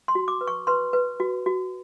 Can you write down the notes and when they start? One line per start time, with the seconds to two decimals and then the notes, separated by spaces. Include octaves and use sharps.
0.08 C6
0.15 F#4
0.28 D6
0.41 B4
0.48 C#6
0.67 B4 C6
0.93 B4
1.20 F#4
1.46 F#4